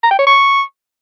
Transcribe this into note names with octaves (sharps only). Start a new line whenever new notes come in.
A#5
G5
C#5
C#6